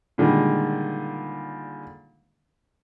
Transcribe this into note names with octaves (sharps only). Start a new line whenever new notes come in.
A#2 D3 D#3 G3 G#3